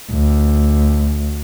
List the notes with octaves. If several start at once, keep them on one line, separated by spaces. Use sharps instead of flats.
D2